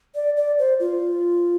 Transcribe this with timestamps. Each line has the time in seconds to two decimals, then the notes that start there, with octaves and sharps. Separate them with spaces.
0.15 D5
0.37 D5
0.59 C5
0.80 F4